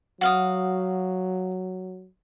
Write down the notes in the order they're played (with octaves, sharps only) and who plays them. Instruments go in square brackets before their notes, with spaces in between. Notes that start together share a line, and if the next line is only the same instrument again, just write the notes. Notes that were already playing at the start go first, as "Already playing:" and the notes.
[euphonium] F#3 [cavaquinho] F#4 F5 D#6